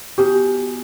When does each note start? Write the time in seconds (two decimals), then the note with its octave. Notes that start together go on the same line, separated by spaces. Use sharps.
0.18 B3 F#4 G4